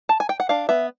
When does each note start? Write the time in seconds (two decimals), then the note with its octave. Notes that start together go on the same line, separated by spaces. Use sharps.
0.09 A5
0.20 G#5
0.29 G5
0.40 F#5
0.49 D4 F5
0.69 B3 E5